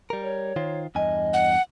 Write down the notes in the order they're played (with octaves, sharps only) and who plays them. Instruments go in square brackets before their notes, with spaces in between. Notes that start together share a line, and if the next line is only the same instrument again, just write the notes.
[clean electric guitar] G3 A#4
[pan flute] C#5
[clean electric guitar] D#3 F4 C5
[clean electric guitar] E2 G2 G#5 [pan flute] D#5
[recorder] F#5